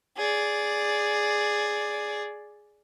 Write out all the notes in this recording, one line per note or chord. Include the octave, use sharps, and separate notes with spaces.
G#4 D5